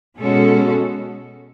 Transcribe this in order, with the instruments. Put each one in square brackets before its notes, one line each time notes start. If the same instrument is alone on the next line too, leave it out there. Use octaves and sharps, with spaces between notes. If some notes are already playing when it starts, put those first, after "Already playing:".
[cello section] B2 G#3 C#4 F#4 A4